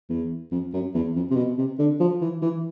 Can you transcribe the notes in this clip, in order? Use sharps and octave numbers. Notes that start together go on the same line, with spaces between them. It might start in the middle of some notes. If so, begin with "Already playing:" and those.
E2
F2
F#2
E2
F2
C3
B2
C3
D3
F3
E3
E3